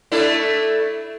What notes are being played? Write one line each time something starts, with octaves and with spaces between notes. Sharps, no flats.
A3 D4 E4